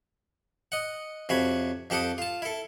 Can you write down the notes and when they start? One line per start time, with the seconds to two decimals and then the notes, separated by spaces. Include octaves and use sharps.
0.72 D#5 F#5
1.29 F2 C3 F#4 C#5 B5
1.90 F2 G4 A4 F#5 G5 D#6
2.18 F4 A5
2.42 E4 A4